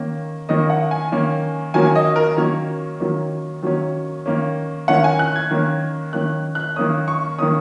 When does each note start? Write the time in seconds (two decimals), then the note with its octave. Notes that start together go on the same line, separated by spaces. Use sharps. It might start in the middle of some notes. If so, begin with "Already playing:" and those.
Already playing: D#3 A#3 C#4
0.49 D#3 A#3 C#4 D#5
0.70 F#5
0.91 G#5
1.12 D#3 A#3 C#4
1.74 D#3 F#3 A#3 C#4 G#5
1.95 D#5
2.16 A#4
2.37 D#3 F#3 A#3 C#4 C#5
3.00 D#3 F#3 A#3 C#4
3.63 D#3 F#3 A#3 C#4
4.26 D#3 A#3 C#4
4.88 D#3 A#3 C#4 F#5
5.04 G#5
5.19 F#6
5.36 G#6
5.51 D#3 A#3 C#4
6.13 D#3 A#3 C#4 F#6
6.55 F#6
6.76 D#3 A#3 C#4 D#6
7.08 C#6
7.38 D#3 A#3 C#4 D#6